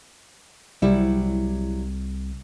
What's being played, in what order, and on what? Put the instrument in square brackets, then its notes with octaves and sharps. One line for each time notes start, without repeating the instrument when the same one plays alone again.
[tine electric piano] C2 [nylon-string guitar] F#3 G3 E4